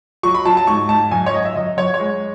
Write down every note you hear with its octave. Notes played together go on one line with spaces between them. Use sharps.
F#3 C#6
B5
F#3 A5
A5
G#2 C#6
G#2 A5
F#2 G#5
C#5
F#2 D#5
E5
F#2 D#5
F#2 C#5
C#5
G#3